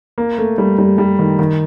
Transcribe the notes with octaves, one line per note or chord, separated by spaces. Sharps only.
A#3
A3
G3
G3
G3
D#3
D#3